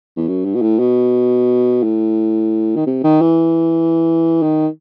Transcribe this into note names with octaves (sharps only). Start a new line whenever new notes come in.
E2
F#2
G2
B2
A2
B2
A2
D#3
C3
D#3
E3
D#3